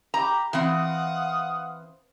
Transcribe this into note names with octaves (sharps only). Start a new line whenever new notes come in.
G4 A#5
E3 C4 F5 F#5 D#6